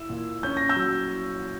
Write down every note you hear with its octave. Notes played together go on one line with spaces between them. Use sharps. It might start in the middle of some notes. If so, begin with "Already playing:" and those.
Already playing: E4 E6
A#2
C#4 G6
A#6
E6 G6
F#3